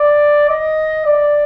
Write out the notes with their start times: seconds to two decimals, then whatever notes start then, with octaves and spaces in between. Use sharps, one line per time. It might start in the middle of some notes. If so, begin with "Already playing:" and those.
Already playing: D5
0.49 D#5
1.06 D5